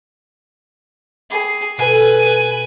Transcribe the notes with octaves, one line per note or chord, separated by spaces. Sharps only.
G#4 G5 B5 D6
B2 A4 B4 G#5 D#7